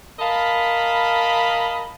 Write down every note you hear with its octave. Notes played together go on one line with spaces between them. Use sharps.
A#4 D#5 F5 A5 B5